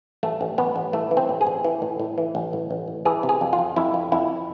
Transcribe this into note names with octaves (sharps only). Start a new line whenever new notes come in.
A1 A3
A1
A1 B3
A1
E3 A3
E3
C4
A1
G#4
A1
E3
A2
A2
E3
A1
A2
A1
A2
E3 G#4
C3
G#4
F2
F4
F2
F2 E4
F2
F2 E4